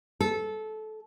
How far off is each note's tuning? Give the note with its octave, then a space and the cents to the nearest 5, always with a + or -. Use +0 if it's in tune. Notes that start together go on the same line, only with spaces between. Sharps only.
A4 -20